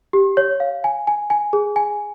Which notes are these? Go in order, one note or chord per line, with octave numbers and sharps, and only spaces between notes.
G4
C#5
F5
G#5
G#5
G#5
G#4
G#5